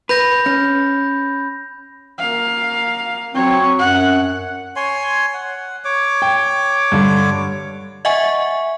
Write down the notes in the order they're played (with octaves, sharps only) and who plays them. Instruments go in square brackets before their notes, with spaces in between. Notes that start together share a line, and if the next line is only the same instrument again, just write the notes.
[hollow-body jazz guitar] B4 [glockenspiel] B5 G6 A#6
[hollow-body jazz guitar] C#4
[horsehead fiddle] A#3 F5
[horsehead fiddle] F#3 C#5 [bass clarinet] C4
[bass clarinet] F#2 [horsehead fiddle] F#5
[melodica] C#5 G#5 C6
F#5
C#5 D6
[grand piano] G5
G2 D3
[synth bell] D#5 E5 F#5 G#5 C#6